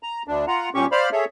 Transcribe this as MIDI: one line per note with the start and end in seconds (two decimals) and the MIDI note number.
0.03 0.23 82
0.28 0.45 38
0.28 0.45 62
0.48 0.69 65
0.48 0.69 78
0.48 0.69 82
0.75 0.86 43
0.75 0.86 46
0.75 0.86 61
0.75 0.86 67
0.75 0.86 85
0.92 1.09 72
0.92 1.09 74
0.92 1.09 77
0.92 1.09 83
0.92 1.09 89
1.12 1.25 68
1.12 1.25 69
1.12 1.25 73
1.12 1.25 76